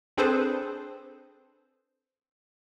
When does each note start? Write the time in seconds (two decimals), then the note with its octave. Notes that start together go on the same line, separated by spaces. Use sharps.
0.17 C4 D4 G#4 A4 B4 C5